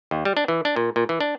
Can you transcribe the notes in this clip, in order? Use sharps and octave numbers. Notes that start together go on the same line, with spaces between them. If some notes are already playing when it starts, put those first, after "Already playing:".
D#2
G3
D4
E3
D4
A#2
A#2
E3
D4